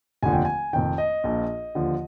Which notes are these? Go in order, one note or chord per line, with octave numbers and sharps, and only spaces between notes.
F1 D#2 D3 F3 G#5
G5
G#5
F1 F2 D#3 G5
D#5
A#1 A#2 F3
D#2 D3 F3